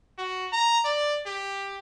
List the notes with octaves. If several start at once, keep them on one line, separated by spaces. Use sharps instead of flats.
F#4
A#5
D5
G4